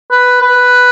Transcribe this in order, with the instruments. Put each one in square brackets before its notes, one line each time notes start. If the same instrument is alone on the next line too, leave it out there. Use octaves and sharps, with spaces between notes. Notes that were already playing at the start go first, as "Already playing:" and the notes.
[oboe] B4
B4